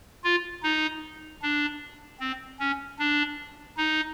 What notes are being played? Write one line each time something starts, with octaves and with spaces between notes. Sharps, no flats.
F4
D#4
D4
C4
C#4
D4
D#4